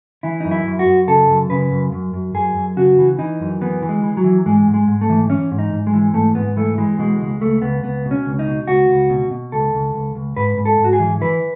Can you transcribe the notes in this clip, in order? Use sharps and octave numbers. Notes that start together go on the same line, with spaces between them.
E3 E4
F#2 D#4
E4
F#2
F#4
F#2
C#3 A4
F#2
C#3 B4
F#2
F#2
F#2
F#2 G#4
F#2
C#3 F#4
E3
E3 D#4
F#2
E3 B3
E3
G#3
E3
F#3
E3
G#2 G#3
G#2
G#3
G#2
A3
E3
E3 C#4
G#2
D#4
G#2
G#3
E3
G#2 A3
G#2 B3
E3 A3
E3 G#3
B2 G#3
C#2 G#3
C#2 A3
C#2 B3
C#2 B3
B2
C#4
C#2
D#4
B2
C#2 F#4
C#2
B2
B2
C#2 A4
C#2
C#2
C#2
G#2 B4
G#2
A4
G#2 F#4
G#4
E3
E3 B4